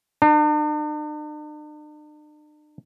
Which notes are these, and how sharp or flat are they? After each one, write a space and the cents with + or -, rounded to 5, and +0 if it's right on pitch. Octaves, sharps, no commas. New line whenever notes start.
D4 +45